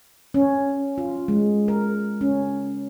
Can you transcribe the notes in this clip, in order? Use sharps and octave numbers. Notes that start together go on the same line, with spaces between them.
C#4
F4
G#3
A#4
C#4